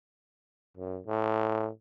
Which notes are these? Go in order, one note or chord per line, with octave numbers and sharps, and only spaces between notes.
F#2
A2